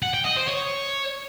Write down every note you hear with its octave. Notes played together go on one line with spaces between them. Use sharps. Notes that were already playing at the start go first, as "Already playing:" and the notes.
F#5
G5
D#5
C5
C#5